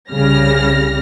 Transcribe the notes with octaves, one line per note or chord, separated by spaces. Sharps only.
C2 C#3 G3 F6 A#6